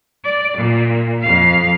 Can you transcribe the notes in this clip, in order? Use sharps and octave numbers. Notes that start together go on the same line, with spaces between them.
D5
A#2
F2 F5